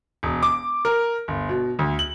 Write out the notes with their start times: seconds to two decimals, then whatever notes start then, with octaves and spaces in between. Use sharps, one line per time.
0.23 E1
0.43 D6
0.85 A#4
1.28 G1
1.49 B2
1.79 D2
1.99 F#7